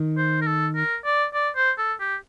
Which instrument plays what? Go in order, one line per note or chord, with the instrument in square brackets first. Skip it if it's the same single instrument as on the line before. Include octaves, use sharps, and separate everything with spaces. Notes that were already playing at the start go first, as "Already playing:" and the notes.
Already playing: [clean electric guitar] D#3
[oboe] C5
A#4
A4
A#4
D5
D5
C5
A4
G4